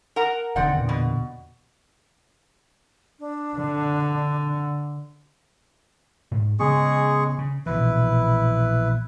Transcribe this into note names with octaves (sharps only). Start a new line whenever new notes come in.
A#4 F#5 A#5
E1 D3 D#3 C4 D5 F#5
E2 A#2 D3
B2
D4
D3
G#2
C#3 G#3 B3 G#4 C#6
C#3
A#1 B2 E3 E4 B4